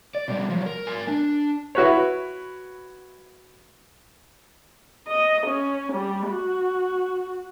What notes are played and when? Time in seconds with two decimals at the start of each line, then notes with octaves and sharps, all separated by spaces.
0.15 D5
0.28 B2 G3
0.50 F3 F#3
0.66 A#4
0.86 A#4 G#5
1.08 D4
1.75 E4 F#4 B4 C#5
5.08 D#5
5.47 C#4
5.93 G3
6.29 F#4